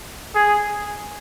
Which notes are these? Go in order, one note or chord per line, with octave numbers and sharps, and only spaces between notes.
G#4